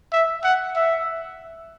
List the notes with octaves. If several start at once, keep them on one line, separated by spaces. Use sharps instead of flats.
E5
F#5
E5